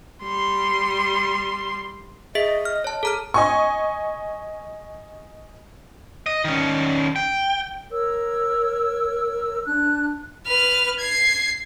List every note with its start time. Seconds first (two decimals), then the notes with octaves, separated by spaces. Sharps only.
0.24 G3 C6
2.35 G#4 D#5 E5 B6
2.65 F6
2.84 C#5 A5
3.03 G#4 A4 A#5 F6
3.34 D#5 G#5 C#6
6.26 D#5
6.44 D#3 C#4
7.16 G5
7.91 A#4 C#5 E6
9.66 D4 F#6
10.47 B4 F6
11.00 G#6 C7